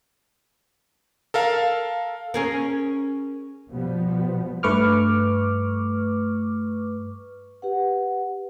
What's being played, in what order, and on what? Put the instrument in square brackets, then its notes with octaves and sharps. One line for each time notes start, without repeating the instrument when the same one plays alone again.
[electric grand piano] A4 A#4 F5
[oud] C#4 G#4 A#4
[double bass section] B2 F3 G3 B3
[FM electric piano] G2 A3 B4 C#6 D6 F6
[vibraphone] G4 B4 F#5